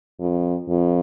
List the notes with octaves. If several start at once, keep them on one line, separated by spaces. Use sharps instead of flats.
F2
F2